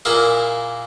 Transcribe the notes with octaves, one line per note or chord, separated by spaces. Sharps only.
A#2 A#3 E4 G#4